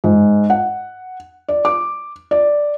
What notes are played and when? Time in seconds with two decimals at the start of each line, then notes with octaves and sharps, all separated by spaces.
0.04 G#2
0.50 F#5
1.48 D5
1.65 D6
2.31 D5